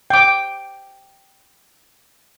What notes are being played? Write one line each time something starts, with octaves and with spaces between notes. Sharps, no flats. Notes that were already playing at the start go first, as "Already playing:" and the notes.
G5 D6